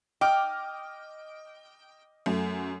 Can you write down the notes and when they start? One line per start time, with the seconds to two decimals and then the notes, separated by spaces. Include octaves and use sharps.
0.21 D#5 G5 D6 F6
2.26 F#2 A3